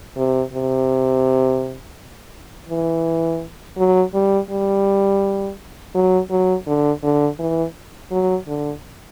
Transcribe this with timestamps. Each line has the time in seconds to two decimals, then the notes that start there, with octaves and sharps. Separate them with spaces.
0.17 C3
0.53 C3
2.69 E3
3.77 F#3
4.14 G3
4.50 G3
5.95 F#3
6.30 F#3
6.67 D3
7.03 D3
7.39 E3
8.11 F#3
8.47 D3